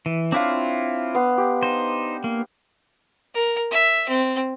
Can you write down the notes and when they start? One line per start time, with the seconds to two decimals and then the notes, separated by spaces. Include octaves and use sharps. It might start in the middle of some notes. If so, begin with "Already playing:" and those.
0.06 E3
0.32 C4 D4 E4 F4 C#5 F5
1.15 B3 C6
1.38 G4
1.63 D#4 C5
2.24 A#3
3.34 A#4
3.71 E5
4.09 C4